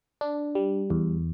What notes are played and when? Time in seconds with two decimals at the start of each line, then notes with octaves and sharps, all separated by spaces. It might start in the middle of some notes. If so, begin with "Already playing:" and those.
0.21 D4
0.55 G3
0.90 E2